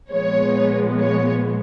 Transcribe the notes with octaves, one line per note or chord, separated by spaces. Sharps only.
A#2 F3 G#3 B3 C#5
C#5